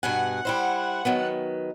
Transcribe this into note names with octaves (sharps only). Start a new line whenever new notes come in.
G2 B2 F#5 G#5
G3 E4 C5
D#3 F#3 B3